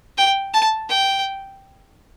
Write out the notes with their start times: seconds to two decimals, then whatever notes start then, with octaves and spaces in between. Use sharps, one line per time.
0.18 G5
0.54 A5
0.89 G5